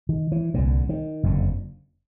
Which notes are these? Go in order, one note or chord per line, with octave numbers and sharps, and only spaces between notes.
D#3
E3
C2 A#2 D3
D#3
F#1 F2 D3